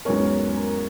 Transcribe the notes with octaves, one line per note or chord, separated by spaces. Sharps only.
E2 G#2 F#3 B3 C#4 A#4